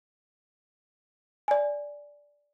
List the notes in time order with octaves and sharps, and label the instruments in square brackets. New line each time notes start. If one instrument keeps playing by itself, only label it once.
[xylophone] D5 G#5